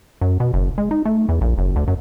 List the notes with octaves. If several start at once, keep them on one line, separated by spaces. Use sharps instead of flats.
F#2
B2
F#1
G#3
D#4
A3
E2
A#1
F#1
D2
F#2